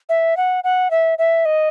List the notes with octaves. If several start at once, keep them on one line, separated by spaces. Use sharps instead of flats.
E5
F#5
F#5
E5
E5
D#5